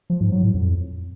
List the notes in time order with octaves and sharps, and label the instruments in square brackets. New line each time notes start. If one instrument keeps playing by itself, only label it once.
[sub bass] F3
G#2
F#3
A2
F2